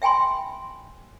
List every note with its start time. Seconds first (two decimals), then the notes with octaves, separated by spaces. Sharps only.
0.02 E5 G5 G#5 B5 C6